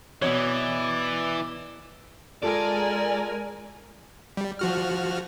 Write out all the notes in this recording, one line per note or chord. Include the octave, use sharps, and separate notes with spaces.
B2 E3 C#5 D5
G#3 F4 A4 A#4 D5 G#5
G3
F3 F#4 F6